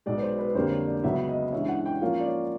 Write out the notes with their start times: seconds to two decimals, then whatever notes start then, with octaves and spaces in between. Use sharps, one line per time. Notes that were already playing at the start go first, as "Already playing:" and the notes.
0.06 B1 B2 G#3 D5
0.18 B4
0.22 C5
0.39 B4
0.55 F2 D3 G3 A#3 C5
0.71 C#5
0.88 D5
1.03 C#2 C#3 F#3 B3 E5
1.29 D#5
1.52 G2 E3 G#3 C#4 E5
1.69 F#5
1.86 G5
2.02 G#2 F3 A#3 C#4 F4 F5
2.21 D5
2.26 C#5